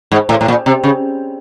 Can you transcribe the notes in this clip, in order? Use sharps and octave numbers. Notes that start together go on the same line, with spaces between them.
G#2
A2
A2
A#2
C3
C#3